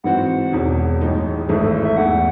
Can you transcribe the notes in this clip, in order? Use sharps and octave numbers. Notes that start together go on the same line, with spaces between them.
G#2 E3 C4 F#4 F#5
E1 E2 D#3
A1 A2 G#3 D#4
G#1 G#2 E3 A3 G#4
A4
A4
E5
E2 D#3 A3 F#5